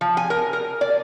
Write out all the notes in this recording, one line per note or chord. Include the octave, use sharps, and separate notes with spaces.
F3
G#5
A#4
A#4
D5